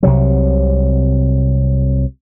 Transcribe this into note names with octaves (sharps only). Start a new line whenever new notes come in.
C2 C3 F#3